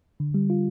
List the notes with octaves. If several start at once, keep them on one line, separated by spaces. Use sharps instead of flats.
D3
G3
F4